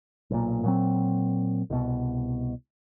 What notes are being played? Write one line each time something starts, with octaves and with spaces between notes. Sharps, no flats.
B1 A#2
A#2 F#3 C4
C2 B2